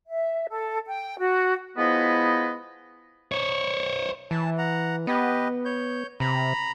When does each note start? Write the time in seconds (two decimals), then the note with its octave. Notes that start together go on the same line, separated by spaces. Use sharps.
0.08 E5
0.50 A4
0.86 G5
1.19 F#4
1.77 F3 G#3 B3 E4 B4 D#5
3.32 C5 C#5
4.31 E3 A5
4.58 F#5 A#5
5.07 B3 G4 B4 D#5
5.65 C#5 G6
6.20 C3 A#5 B5